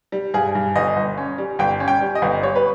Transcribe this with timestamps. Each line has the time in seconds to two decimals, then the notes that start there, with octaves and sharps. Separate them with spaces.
0.12 G3
0.34 G2 G#4
0.55 G2
0.76 G1 D#5
0.97 G1
1.17 C#4
1.38 G3
1.59 G1 G5
1.80 C#4
1.88 G5
2.01 G3
2.15 D#5
2.22 G1
2.43 G3 C#5
2.55 B4